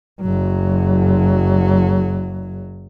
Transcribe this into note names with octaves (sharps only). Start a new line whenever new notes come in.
F#1 F#3